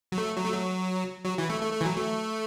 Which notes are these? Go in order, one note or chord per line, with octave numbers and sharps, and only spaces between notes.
F#3
A3
F#3
A3
F#3
F#3
E3
A3
A3
A3
E3
F#3
A3